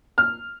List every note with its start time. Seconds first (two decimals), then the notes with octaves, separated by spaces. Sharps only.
0.18 F6